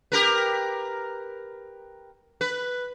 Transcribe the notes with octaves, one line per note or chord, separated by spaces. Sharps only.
G4 A#4 B4
B4